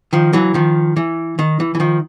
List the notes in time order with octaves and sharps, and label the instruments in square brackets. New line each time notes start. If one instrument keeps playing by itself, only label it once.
[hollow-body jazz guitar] D#3 F3
E3 F#3
D#3 F3
E3
D#3
E3
E3
D#3 F3